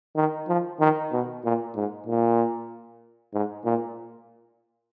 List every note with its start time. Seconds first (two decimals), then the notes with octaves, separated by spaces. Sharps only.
0.16 D#3
0.48 F3
0.80 D#3
1.12 B2
1.44 A#2
1.76 G#2
2.07 A#2
3.34 G#2
3.65 A#2